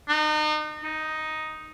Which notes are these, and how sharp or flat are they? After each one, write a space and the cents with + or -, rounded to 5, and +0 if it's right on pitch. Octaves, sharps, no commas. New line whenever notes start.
D#4 -35
D#4 +5